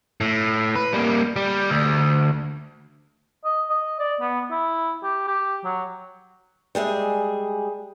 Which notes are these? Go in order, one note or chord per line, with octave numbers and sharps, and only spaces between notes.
A2
B4
G3 A#3
G3
D2
D#5
D#5
D5
B3
E4
G4
G4
F#3
G3 G#3 G#4 E5